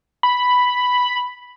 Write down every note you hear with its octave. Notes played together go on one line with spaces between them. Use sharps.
B5